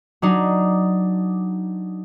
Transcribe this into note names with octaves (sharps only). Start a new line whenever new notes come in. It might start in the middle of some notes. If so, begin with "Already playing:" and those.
F#3 D4 D#4